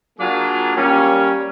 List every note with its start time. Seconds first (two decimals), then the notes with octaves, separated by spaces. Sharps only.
0.18 F#3 A#3 D4 F4 G#4
0.75 G3 A#3 C#4